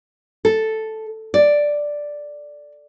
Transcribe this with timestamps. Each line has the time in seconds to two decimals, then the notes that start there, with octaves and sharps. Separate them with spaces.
0.45 A4
1.34 D5